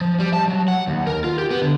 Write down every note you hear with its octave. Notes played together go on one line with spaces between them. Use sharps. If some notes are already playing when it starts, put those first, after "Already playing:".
F3
G3
A5
F#3
F#5
D#2
A#4
F4
G4
B3
D3